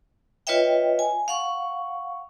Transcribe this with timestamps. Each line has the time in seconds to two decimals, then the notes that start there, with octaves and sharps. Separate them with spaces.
0.47 F4 B4 C#5 D#5 E5 G5
0.99 G#5
1.28 F5 F#5 C#6